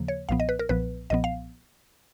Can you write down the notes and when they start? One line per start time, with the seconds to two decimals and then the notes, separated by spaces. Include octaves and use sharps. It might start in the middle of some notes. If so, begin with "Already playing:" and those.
Already playing: D#2 C#3 F3 A#3
0.08 C#5
0.29 B1 A#2 F3 B3 F5
0.40 D#5
0.49 B4
0.59 A#4
0.69 B1 A#2 F3 B3 B4
1.10 B1 A#2 F3 B3 D#5
1.24 F5